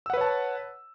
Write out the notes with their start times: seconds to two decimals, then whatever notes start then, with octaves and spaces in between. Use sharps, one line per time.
0.06 E6
0.10 F#5
0.14 B4
0.17 C#5
0.21 A5